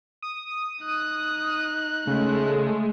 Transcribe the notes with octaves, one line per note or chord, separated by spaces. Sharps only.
D#6
D#4 F#6
C#3 G#3 A3